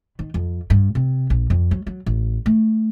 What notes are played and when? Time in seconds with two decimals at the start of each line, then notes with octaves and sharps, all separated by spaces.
0.19 D#3
0.34 F2
0.70 G2
0.95 C3
1.30 A#1
1.50 F2
1.71 F#3
1.87 F#3
2.06 A1
2.46 A3